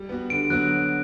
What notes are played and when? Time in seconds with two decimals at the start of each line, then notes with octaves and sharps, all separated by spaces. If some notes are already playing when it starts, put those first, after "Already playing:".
Already playing: G3
0.09 B3 F#4
0.30 D3 D7
0.50 F#3 B3 F#4 F#6